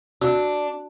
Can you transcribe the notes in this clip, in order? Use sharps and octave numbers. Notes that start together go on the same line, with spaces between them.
D4 F#4